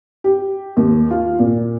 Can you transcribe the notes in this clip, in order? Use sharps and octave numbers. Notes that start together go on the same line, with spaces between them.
G4
D#2
F4
A#2